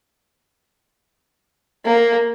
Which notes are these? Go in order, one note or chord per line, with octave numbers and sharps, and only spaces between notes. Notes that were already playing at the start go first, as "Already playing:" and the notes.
A#3